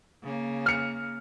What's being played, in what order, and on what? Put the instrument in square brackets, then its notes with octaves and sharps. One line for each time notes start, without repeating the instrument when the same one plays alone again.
[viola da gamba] C#3 A#3
[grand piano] F6 C#7